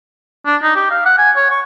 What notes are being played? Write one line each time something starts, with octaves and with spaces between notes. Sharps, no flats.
D4
D#4
G4
F5
F#5
G#5
C#5
C#6